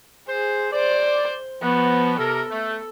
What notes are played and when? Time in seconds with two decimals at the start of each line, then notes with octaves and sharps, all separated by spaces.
0.29 G#4 C5
0.73 C5 D5
1.62 F3 B3 F#4
2.19 C3 A4 A#4
2.51 A3